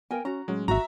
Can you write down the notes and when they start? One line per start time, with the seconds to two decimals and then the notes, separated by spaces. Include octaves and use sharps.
0.11 B3 A#4 F5 G5 G#5
0.25 C#4 F#4 A#5
0.48 A2 F#3 G#3 C#4
0.68 G#1 F#4 E5 A#5